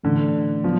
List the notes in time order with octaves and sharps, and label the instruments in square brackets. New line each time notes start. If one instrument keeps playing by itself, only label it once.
[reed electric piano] A2 E3 A3 [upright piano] D3
[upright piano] F3 [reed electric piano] F#3 B3